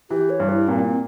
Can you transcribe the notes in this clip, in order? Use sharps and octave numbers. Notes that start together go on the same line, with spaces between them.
E3 G4
C#5
G2
E4
A#2 C4
C4